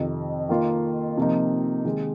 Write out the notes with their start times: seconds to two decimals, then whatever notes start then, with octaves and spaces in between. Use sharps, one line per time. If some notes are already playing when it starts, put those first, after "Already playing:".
Already playing: F2 C3 D#3
0.49 D#3 A#3 F4
1.17 C3 F3 A#3 D#4
1.85 C3 D#3 G#3